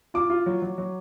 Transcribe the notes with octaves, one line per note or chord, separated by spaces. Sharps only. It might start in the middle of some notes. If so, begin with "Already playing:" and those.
F4 D6
F4
F#3
F#3
F#3